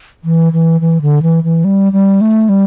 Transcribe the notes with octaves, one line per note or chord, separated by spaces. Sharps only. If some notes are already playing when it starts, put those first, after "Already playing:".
E3
E3
E3
D3
E3
E3
G3
G3
A3
G3